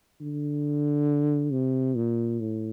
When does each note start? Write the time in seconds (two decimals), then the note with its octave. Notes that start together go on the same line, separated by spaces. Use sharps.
0.21 D3
1.52 C3
1.96 A#2
2.40 A2